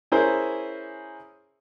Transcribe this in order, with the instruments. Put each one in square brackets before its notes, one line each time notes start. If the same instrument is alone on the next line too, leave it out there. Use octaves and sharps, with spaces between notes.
[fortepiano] C#4 E4 G#4 A#4 C5